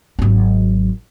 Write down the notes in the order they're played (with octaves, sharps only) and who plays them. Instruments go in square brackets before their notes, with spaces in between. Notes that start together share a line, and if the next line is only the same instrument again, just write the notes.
[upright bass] G#1 F#3